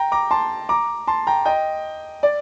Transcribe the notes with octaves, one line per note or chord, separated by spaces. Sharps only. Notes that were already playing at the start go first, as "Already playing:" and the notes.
Already playing: G5 A#5
A#5 D6
A5 C6
A#5 D6
A5 C6
G5 A#5
D#5 G5
D5